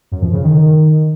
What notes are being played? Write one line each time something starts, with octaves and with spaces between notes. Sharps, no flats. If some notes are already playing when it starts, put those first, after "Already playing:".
F#2
F3
C#3
D#3